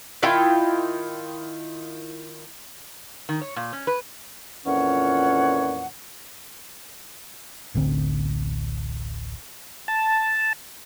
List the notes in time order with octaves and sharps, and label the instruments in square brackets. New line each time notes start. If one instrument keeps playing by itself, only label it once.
[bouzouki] D#3 E4 F4 G5
[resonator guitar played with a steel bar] D#3
C#5
A#2
C#4
B4
[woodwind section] F2 A#2 E3 C#4 C#5 F#5
[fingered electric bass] D1 A1 D3 C4
[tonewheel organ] A5